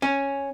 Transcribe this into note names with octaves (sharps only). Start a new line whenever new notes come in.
C#4